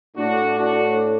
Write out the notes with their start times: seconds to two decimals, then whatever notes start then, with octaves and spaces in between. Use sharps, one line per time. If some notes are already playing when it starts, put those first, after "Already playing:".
0.16 A2 D4 F#4
0.58 D4 F#4